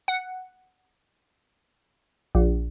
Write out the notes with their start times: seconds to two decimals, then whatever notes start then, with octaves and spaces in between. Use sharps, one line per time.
0.08 F#5
2.35 A#1